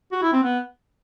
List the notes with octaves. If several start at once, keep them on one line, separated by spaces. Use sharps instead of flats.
F#4
E4
C4
B3